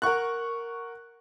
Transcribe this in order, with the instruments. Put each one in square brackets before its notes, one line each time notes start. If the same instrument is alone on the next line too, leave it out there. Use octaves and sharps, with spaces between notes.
[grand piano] A#4 F#5 C#6 F#6